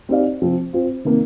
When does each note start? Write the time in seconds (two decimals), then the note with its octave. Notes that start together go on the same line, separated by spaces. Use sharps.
0.09 C4 D#4 G4 D5 F5
0.42 C3 F3 C4
0.73 C4 F4 C5
1.04 C3 D#3 A#3